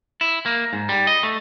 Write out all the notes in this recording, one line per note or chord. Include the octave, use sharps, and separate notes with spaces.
E4
A#3
G#2
G3
D#5
A3